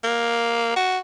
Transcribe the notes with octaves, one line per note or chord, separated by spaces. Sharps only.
A#3
F#4